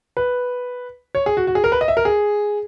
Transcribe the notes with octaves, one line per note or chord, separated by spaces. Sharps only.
B4
C#5
G#4
F#4
F#4
G#4
A#4
B4
D#5
E5
A#4
G#4